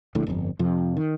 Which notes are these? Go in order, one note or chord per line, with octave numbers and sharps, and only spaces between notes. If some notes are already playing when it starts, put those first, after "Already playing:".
D1 A#1 A2 D3
G1 F2
F2 C3 F3
D#3